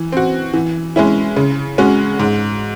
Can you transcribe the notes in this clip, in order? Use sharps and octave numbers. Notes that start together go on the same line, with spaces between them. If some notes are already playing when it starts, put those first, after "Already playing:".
Already playing: E3
C4 F#4
E3
G#3 C#4 E4
C#3
G#3 C#4 F#4
G#2